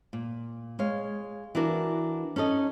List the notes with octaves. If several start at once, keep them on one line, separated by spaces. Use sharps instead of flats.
A#2
G#3 C#5 F5
E3 B3 D4 F#4 A#4
C#4 D#4 A4 D#5